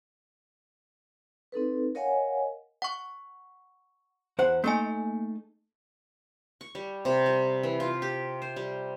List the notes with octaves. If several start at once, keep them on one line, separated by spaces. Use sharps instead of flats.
C4 D#4 A4 B4
A#4 C#5 D#5 F5 F#5 G#5
F#5 C#6
E2 C5 F#5
A3 A#3 D#4 G#5
C#6
G3
C3
G3
E3
F4
G4
C5
G3